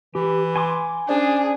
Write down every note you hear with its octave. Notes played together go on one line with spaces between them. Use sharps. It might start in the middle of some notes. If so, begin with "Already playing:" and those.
E3 G4
G#5 C6 D6
C#4 D4 G#4 C5 D5